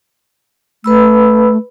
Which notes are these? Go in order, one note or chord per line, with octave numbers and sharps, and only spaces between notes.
A3 B4 B5 E6